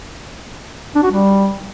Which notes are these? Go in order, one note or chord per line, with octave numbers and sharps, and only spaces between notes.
D4
F#4
G3